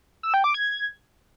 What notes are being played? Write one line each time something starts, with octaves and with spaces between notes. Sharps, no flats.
E6
G5
D6
G#6